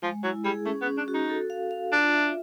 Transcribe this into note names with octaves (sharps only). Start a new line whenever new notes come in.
F3 G#3
F#3 E4
G3 G#4
A3 C#4
B3
C#4
D4
F#4
D#4
A4
F5
F5
D4 F4
E5